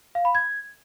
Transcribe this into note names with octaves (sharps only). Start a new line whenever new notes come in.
F5
B5
G#6